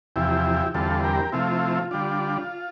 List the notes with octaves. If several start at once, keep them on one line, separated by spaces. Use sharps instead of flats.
E2 C3 F3 E4 G4
E2 D3 G3 C4 F4 A4
G4 A#4
C3 F3 A3 C4 E4 F4
D3 G3 D4 F4